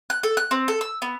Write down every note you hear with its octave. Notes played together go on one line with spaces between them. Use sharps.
F#6
A4
F#6
C4
A4
E6
B3